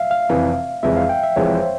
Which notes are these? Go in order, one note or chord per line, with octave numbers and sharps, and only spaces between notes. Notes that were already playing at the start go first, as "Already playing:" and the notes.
Already playing: E5 F5
F5
F1 F2 C3 E3
F1 F2 E3 G#3 E5
F5
G5
E5
F1 F2 E3 G#3 C#5
C5